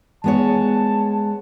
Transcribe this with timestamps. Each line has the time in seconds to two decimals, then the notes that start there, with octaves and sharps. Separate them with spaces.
0.24 G#3 B3 C#5 A5